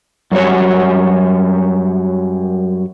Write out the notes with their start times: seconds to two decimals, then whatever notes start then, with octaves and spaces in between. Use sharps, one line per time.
0.32 F#2 F#3 G3 F#4 C#5